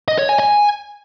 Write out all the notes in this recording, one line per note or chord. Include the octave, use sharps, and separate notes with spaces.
D#5
C#5
G#5
G#5